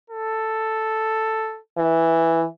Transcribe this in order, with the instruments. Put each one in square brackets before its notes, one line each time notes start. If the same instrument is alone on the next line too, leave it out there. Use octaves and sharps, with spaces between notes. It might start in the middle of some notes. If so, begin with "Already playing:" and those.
[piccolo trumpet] A4
[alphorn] E3